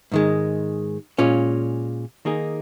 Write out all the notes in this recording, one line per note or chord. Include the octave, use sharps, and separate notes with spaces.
G#2 D#3 G#3
A#2 G#3 C#4 F4
D#3 A#3 D#4 G#4